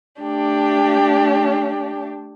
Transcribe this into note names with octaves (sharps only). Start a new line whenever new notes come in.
A3 D4 G4